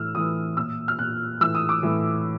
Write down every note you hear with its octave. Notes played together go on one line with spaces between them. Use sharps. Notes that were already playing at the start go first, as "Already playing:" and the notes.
Already playing: A2 E3 E6 F6
A2 E3 D#6
A#2 E6
F6
A#2 F#6
A2 E3 E6
D#6
D6
A2 E3